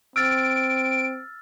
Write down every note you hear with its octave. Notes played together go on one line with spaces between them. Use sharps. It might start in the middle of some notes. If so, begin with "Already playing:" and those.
C4 E6 F6 A6 D7